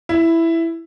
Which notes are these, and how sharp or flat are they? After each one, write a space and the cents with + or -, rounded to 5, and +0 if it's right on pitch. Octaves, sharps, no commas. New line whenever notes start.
E4 +5